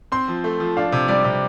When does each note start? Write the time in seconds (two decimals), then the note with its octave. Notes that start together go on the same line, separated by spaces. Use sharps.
0.12 C4 C6
0.28 F3
0.44 A3
0.60 F3
0.77 D4 F5
0.92 C3
1.08 G3 D5
1.24 C3